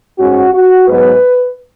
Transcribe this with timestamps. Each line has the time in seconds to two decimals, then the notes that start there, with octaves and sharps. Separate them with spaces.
0.18 G#2 G#3 C#4 F#4
0.53 F#4
0.88 G#2 F#3 B3 B4